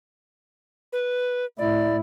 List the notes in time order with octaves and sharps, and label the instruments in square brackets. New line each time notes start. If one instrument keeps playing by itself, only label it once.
[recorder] B4
[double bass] A2 E4 [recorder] D5